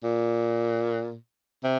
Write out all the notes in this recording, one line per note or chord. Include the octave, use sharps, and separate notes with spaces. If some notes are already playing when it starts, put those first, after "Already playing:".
A#2
C3